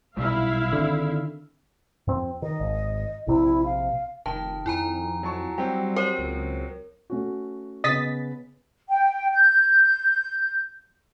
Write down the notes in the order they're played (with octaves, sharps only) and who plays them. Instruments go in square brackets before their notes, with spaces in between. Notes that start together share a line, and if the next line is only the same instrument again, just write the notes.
[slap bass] B1 A#2 G3 [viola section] E4 E5 F5
[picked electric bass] D3 [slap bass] D#3 C4
[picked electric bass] F2 C4
[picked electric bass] D#3 [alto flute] D#5
[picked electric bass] G#1
[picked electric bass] A#1 C3 [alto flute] E4
[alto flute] F5
[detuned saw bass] F1 [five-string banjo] D#3 [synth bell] A5
[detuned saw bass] F2 [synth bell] E4 G#5 A#5
[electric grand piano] F#3 A5 C#6
[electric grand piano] F#3 C4 [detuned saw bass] G3 [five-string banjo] G4
[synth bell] A#4 C#5 [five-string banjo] C5
[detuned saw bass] C#2
[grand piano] A3 C#4 F#4
[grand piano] C#3 B3 [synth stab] D#5 A6 B6
[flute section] G5
G6